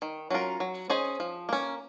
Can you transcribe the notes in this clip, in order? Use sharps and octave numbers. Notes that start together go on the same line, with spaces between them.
D#3
F#3 C#4 F4 A#4
F#3
C#4 G#4 C5 D#5
F3
A#3 C#4